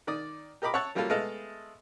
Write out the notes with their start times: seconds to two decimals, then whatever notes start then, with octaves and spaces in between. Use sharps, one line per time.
0.07 D#3 D5 D#6
0.62 G4 A#4 D#5 B5 D6
0.74 C#5 E5 F#5 A5 C#6
0.95 F#3 G3 A#3 C#4 F4 A4
1.10 G#3 A3 B3 A4 D#5 F5